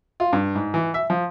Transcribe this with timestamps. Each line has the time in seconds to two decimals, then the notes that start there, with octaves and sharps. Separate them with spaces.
0.20 F4
0.33 G2
0.55 G#2
0.74 E3
0.94 E5
1.10 F3